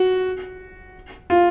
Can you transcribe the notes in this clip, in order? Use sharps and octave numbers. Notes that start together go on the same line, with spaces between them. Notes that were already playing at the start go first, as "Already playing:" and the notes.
Already playing: F#4
F4